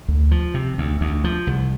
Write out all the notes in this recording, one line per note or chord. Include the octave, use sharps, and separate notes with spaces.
D2
F3
C3
D2
D2
F3
C2